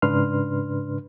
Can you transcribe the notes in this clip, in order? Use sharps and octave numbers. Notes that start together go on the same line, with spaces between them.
G#2 C#3 D4 B4 C6 F6